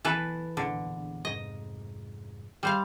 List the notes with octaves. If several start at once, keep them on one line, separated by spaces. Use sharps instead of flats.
B1 E3 A4 B4
E1 A#1 E2 D3
F2 G#2 C3 D#5
G3 C5 F5